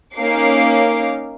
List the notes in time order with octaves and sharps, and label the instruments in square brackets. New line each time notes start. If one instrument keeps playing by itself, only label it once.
[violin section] A#3 C#4 D#4 F5 D6 C7